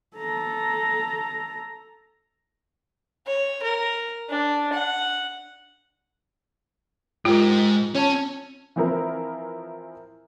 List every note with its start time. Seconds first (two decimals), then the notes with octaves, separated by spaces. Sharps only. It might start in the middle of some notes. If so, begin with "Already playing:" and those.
0.16 A4 A#5
3.27 C#5
3.63 A#4
4.29 D4
4.73 F#5
7.25 G#2 F4 G4 A#4
7.95 C#4 C#5 A5
8.76 E3 F3 C4 E4 A#4